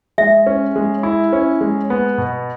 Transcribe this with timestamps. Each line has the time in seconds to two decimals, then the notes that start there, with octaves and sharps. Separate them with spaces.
0.18 G#3 E5
0.46 C#4
0.76 G#3
1.03 E4
1.33 C#4
1.61 G#3
1.90 B3
2.18 B2